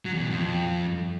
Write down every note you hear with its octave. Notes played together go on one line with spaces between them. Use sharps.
F#3
E2
B2
F2